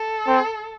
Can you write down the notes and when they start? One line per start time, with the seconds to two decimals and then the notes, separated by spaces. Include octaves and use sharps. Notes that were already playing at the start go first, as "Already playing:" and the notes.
Already playing: A4
0.28 C4